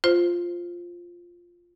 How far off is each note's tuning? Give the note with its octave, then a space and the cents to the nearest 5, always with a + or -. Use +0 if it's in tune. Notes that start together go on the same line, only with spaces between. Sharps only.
F4 +0 C5 +0